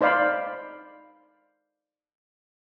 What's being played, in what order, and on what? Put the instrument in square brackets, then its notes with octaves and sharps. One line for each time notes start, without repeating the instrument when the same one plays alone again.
[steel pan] D#4 C5 D5 F5 B5